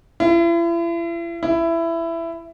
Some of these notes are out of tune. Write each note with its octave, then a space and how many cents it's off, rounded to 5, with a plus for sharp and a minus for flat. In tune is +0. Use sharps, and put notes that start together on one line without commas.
E4 +40
E4 +15